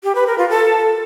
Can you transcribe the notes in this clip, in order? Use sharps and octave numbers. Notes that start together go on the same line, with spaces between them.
G4
B4
A#4
F4
A4